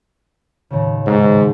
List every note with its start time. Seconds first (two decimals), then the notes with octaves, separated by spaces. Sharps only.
0.70 D#2 A2 C#3
1.07 G#2